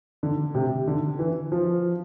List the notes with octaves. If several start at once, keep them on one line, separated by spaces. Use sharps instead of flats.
D3
C3
D3
E3
F3